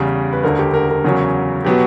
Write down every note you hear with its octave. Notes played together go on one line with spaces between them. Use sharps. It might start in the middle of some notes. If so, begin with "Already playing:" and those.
Already playing: E2 C#3 G3
B4
E1 D2 D3 A#4
G4
A#4
A#4
E2 C#3 F#3 C#4
B2 F#3 B3 G4